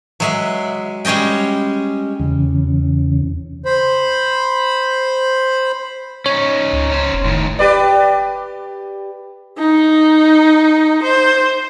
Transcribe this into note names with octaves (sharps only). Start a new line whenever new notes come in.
F#3 G#3 E5
G3 G#3 C#4 D#5 G5
E2 C#3
C5 B5
C#4 D#4 C#5
C#2
C#4 C5
F1
A2 D#3
G4 B4 D5
D#4
C5